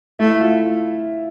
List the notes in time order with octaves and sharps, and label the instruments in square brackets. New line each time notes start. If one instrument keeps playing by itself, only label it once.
[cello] A3 [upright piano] E4 E5
[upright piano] E4 E5
F4 F5